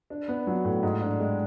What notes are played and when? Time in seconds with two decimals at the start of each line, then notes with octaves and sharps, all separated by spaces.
0.10 D4
0.28 B3
0.47 F#3
0.65 A2
0.83 G#2
1.01 D4
1.20 G#3